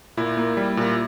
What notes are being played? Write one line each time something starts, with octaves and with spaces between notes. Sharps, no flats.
A#2 E4
A#3
G3
A#2